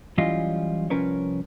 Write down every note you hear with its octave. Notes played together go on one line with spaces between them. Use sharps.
E3 F#3 G3 C#4 F4 D#5
C2 F3 C#4 A#4 B4 C#5